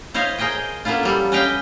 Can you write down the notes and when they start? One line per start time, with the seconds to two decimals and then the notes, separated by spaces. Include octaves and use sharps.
0.14 E4 C5 C#5 D#5 F5
0.38 G#4 A#4 C5 D#5 G5
0.85 A#3 B3 C#4 E4 F4
1.03 F#3 G3 A4
1.32 C#4 B4 D#5 F5 G5